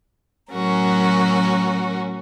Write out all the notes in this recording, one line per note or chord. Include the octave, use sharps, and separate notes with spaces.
A2 F#3 C#4 F#4 A#4